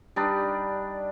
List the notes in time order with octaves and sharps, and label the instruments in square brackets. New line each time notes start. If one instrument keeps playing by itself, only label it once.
[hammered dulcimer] G3 D4 D#4 D5